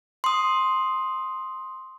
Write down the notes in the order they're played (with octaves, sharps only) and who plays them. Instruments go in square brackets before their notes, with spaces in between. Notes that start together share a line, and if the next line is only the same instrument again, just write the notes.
[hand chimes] C6 D#6